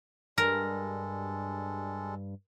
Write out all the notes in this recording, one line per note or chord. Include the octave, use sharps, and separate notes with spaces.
G2 G3 G#3 A4 A#4